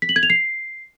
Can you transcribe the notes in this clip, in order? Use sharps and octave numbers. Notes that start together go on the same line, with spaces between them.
B6
F#7
G#6
F7
C7